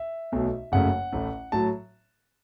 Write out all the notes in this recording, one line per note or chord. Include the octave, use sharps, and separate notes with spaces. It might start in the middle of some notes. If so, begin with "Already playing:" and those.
Already playing: E5
B1 B2 A3
F#1 F#2 C#3 A3 F#5
A1 A2 A3
A2 F#3 A5